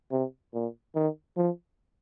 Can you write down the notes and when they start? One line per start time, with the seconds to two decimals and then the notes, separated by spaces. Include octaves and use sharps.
0.11 C3
0.54 A#2
0.95 D#3
1.37 F3